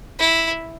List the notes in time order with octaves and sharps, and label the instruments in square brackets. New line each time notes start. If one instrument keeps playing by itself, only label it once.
[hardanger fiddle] E4